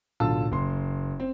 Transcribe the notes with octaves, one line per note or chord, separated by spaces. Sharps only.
D1 B1 D3 F4 A5 E6
F#1 C6
C4